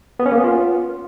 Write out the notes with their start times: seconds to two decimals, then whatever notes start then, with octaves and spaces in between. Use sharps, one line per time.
0.19 B3
0.26 C#4
0.32 A#3
0.38 B3
0.44 F4